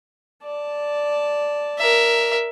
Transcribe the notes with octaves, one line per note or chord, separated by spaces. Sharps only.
D5 A5
A#4 E5